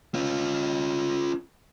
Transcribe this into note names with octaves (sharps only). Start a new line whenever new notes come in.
C#4 F4